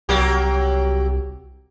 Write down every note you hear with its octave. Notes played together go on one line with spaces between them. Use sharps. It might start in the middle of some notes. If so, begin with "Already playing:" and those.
C2 F#3 A#3 G4